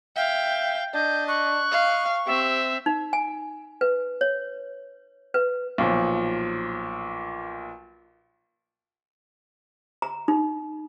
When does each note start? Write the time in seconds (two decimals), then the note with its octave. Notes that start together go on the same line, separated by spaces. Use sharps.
0.17 E5 F5 G5
0.94 D4 D#5 G6
1.28 C#6 F#6
1.72 D#5 F5
2.27 C4 G4 E5
2.86 D#4
3.13 G#5
3.81 B4
4.21 C#5
5.34 B4
5.78 B1 A#2 F3
10.02 A#5
10.28 D#4